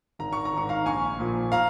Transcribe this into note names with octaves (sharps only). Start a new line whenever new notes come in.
G#1 A#5
C#6
A#5
G#2 D#3 C#6
F5 A#5
A#1 G#5 C#6
A#2 F3
F5 A#5